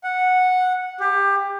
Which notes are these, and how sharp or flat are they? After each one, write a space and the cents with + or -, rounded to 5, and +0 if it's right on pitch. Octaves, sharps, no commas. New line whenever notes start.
F#5 -10
G4 +20